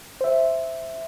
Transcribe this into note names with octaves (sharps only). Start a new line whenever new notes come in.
C5 E5